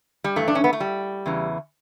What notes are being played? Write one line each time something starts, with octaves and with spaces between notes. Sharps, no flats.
G3
G2 E3 A3
D4
C#4
B3
A3
G3
E2 C#3 E3